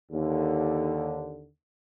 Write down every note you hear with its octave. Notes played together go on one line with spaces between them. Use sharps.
D#2 D3